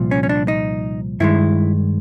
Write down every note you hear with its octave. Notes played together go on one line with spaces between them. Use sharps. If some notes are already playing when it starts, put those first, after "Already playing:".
Already playing: C2 A#2 F3
C#4
C#4
D4
D#4
G2 D#3 G#3 E4